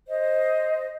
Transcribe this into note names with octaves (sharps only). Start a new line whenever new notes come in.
C5 D#5